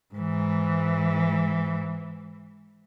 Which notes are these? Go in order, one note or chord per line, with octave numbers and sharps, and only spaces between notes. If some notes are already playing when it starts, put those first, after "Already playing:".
G#2 E3